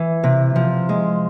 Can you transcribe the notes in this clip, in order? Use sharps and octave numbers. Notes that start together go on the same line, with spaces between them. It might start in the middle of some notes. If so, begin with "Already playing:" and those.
Already playing: E3
C3
F3
G#3